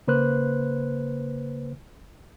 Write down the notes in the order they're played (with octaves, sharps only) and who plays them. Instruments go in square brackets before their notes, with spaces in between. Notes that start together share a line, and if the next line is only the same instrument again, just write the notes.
[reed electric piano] C#3 A#3 B4 C5 F#6